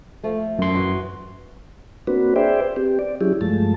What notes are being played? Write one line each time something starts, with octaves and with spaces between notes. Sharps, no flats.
F3 A3
F#2 C6
E3 F#4
A#3 C4 D4 F#4 B4
G#4 B4 C5 D5 E5 G5
C4 G4
D5
F#3 C#4 E4 G4 G#4
G2 F3 G#3 A3 A5